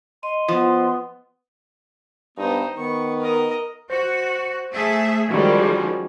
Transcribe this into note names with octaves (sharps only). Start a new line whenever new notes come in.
D#5 C6
F3 B3
G2 B3 D#4 C5
D#3 B3 C#6
A#4 D#5
F#4 C5
A3 G#4 E5
D#3 F3 G3 G#3 C#4 F#4 G#6